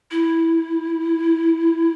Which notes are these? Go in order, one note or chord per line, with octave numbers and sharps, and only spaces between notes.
E4